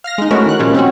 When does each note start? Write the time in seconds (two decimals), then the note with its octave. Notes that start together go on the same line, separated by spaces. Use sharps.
0.04 F5 F6 A#6
0.18 G#3 D#4
0.31 G#3 A3 C#4 E4 F#4 A#4
0.46 D#3 F#6
0.59 A#2 F3 G3 G#3 A#3 C#4
0.74 C4 C#4 F#4